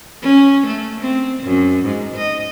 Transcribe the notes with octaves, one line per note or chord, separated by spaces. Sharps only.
C#4
A3
C4
F#2
G#2
D#5